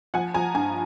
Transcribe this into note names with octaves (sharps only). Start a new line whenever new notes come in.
F3 F#5 G#5
F3 G#5 A#5
G2 G#5 A#5